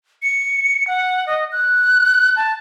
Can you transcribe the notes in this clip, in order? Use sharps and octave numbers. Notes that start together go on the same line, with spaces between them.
C#7
F#5
D#5
F#6
A5